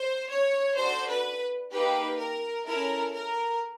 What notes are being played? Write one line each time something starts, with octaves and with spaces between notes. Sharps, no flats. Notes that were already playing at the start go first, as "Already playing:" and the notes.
Already playing: C5
C#5
D4 F#4 A4 C5
B4
A#3 D#4 G4 B4
A#4
C#4 E4 A4 A#4
A#4